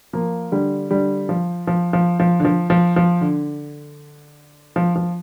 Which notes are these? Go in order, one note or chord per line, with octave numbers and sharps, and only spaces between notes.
F3 A#3
D3 G3
D3 G3
F3
F3
F3
F3
D3
F3
F3
F3
D3
F3
F3